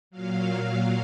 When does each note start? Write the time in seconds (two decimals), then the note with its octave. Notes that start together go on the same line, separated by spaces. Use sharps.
0.11 A#2 F#3 F5